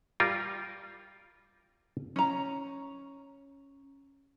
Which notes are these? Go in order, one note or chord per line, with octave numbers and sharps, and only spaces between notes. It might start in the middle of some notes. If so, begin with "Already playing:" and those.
G3 F4 A#4
C#4 A#5